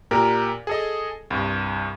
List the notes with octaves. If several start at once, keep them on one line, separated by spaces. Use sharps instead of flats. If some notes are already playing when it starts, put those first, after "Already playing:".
A#2 G4 A#4
G#4 A4 D#5
C2 G2